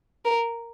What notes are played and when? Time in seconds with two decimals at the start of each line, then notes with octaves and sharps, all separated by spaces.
0.25 A#4